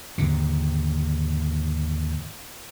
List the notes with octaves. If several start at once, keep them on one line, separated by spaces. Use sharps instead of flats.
D#2 G#2 D3